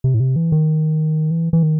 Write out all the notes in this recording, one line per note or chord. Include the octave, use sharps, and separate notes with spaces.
C3
A2
C3
E3
D#3
E3
E3
D#3